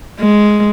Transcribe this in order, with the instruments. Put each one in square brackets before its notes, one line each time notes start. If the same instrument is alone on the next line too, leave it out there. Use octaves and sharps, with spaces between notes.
[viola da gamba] G#3